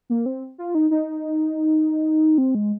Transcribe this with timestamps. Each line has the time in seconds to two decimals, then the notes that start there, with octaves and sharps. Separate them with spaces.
0.10 A#3
0.26 C4
0.58 F4
0.75 D#4
0.91 D#4
2.38 C4
2.55 G#3